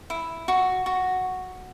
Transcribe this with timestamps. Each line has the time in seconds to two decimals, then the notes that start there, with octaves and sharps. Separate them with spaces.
0.10 E4
0.48 F#4
0.86 F#4